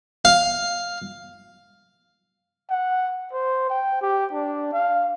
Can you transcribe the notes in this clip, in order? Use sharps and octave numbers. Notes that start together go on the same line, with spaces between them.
F5
F#5
C5
G5
G4
D4
F5